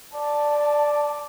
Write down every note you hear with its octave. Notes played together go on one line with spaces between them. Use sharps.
D5 A5